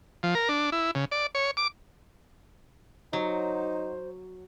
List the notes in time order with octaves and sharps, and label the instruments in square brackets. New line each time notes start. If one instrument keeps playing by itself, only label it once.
[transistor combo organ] F3
A#4
D4
E4
C#3
D5
C#5
D6
[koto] F#3 [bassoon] D#4 [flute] C5